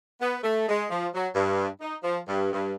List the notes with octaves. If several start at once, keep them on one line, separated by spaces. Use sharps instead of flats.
B3
A3
G#3
F3
F#3
G2
D#4
F3
G2
G2